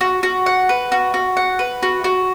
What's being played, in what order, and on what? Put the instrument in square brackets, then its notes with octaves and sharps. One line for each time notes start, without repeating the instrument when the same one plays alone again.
[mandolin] F#4
F#4
F#5
B4
F#4
F#4
F#5
B4
F#4
F#4